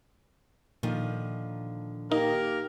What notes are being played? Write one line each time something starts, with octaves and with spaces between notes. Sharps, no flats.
A#2 D3 D#3 F3
A#3 D#4 G4 A#4